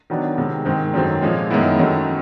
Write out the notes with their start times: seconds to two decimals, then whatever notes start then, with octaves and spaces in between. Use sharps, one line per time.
0.10 D#3 F#3 B3 D4
0.38 C3 D#3 G#3
0.65 G#2 D#3 G#3 C4
0.94 F#2 D#3 F#3 A3 C4
1.22 A#2 F3 G#3
1.50 F#2 D#3 G#3 B3 E4
1.79 F#2 D#3 F#3 A3